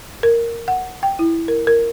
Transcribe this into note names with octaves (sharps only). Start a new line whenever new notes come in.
A#4
F#5
G5
E4
A#4
A#4